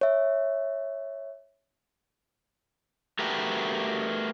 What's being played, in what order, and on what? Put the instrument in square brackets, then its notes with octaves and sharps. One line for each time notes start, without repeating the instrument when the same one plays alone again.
[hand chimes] C#5 E5
[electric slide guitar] A3 F#4 G4 A#4 B4